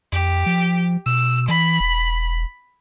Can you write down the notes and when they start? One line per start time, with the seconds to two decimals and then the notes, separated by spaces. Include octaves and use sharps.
0.12 F2 G4
0.46 F3
1.06 B2 E6
1.48 E3 B5
1.80 E1